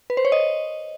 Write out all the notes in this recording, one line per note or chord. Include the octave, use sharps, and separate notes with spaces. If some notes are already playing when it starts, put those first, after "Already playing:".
B4
C5
C#5
D#5